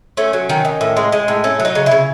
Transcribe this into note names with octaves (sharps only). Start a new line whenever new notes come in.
A3 C#4
F#3
D#3
D#3
A2
G#3
G#3
A2
A3 C#4
F#3
D#4
C#3
E4
C#3